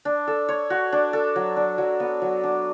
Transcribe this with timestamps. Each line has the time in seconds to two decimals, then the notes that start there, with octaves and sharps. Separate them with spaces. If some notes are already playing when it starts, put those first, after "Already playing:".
0.05 D4
0.27 A4
0.49 C#5
0.70 F#4
0.92 D4
1.13 A4
1.36 F#3
1.57 D4
1.78 F#3
2.00 B3
2.22 F#3
2.44 D4